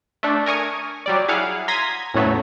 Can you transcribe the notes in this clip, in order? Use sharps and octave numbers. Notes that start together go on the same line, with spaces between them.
A3 D4
A#4 G#5 C#6 D#6
F#3 G3 D5
E4 G#4 F5 F#5
A#5 C6 D#6 G#6 A#6 B6
E2 A2 C#3 F#3 A3 B3